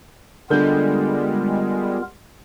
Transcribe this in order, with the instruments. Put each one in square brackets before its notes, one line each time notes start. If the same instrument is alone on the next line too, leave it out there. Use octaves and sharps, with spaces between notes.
[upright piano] D3 G6 [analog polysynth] G3 G#3 [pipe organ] B3 F4 A#4